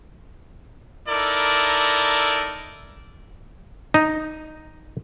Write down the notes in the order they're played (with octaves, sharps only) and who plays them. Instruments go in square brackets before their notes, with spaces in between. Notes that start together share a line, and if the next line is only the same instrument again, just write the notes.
[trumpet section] D#4 E4 A4 A#4 D5
[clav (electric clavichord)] D#4